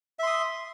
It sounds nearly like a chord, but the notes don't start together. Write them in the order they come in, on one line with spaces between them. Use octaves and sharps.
E5 C6 D#6